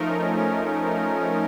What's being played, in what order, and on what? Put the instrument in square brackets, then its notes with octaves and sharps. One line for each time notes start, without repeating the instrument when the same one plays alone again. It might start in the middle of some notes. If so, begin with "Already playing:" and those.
Already playing: [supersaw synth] F3 A3 D#4 A#4
[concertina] C#4
C#4
C#4
C#4